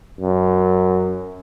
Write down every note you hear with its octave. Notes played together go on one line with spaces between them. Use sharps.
F#2